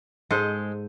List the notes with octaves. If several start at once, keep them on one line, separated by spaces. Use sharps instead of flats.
G#2 G#3 A4 C5